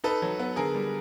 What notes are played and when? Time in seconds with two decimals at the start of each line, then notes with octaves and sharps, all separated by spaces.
0.04 D#4 A4 B4
0.22 F#3
0.39 B3
0.56 D3 G#4 A#4
0.75 G3